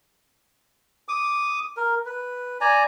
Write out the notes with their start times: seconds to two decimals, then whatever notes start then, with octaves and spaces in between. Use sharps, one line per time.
1.08 D6 D#6
1.77 A#4
2.06 B4
2.61 D5 G#5 A#5